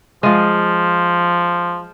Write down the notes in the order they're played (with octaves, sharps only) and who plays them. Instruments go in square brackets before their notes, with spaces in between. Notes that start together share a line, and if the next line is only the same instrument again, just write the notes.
[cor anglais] F3 [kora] G#3 F4